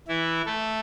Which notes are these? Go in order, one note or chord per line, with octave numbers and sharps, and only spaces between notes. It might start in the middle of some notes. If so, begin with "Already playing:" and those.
E3 E4
A3 A4